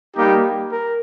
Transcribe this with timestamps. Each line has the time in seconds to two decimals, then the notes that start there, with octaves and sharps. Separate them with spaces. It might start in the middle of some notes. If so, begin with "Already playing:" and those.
0.16 G3 A#3 D#4 G4
0.72 A#4